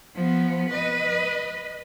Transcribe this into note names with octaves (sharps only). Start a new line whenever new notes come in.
F3 B3
B4 D#5